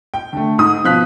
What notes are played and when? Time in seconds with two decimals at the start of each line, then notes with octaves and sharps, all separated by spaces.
0.14 G5
0.33 D3 A3
0.58 G#2 D#6
0.84 B2 F3 F5 F#6 B6